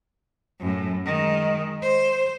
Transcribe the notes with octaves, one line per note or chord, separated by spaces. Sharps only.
F#2 A2
D#3 G#3
C5